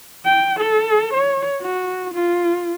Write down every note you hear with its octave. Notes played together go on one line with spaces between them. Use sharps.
G5
A4
C#5
F#4
F4